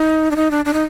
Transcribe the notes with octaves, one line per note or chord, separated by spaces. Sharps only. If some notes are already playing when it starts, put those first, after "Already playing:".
Already playing: D#4
D4
D#4
D4
D4
D#4